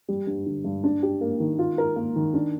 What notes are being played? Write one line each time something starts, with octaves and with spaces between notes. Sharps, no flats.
G3
G2
D3
G2
D4
G4
A#3
D#3
F4
A#4
A#3
D#3
D4